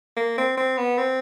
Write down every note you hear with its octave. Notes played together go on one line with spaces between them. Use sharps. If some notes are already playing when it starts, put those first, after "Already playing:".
A#3
C4
C4
B3
C4